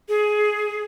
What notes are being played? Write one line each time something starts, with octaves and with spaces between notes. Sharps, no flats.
G#4